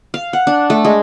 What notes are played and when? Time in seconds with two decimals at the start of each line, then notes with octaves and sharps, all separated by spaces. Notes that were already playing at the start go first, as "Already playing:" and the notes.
0.14 F5
0.33 F#5
0.47 D4
0.70 A3
0.85 G#3